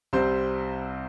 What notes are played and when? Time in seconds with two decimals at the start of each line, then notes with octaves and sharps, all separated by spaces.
0.13 C2 C3 G3 C4 C5